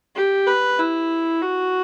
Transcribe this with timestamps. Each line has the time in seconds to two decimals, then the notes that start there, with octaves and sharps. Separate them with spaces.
0.15 G4
0.47 B4
0.79 E4
1.42 F#4